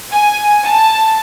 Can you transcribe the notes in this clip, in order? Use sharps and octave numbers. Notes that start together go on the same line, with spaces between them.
G#5
A5